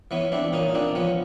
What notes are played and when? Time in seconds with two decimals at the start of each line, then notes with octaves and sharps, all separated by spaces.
0.11 E3 B3 C#4
0.32 E3 C4 D4
0.53 A#2 C#4 D#4
0.69 D#4
0.75 A#2 C4 D4
0.95 F3 B3 C#4